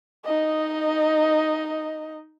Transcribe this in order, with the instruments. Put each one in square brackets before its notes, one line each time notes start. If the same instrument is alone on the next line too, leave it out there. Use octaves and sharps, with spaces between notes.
[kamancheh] D#4 D#5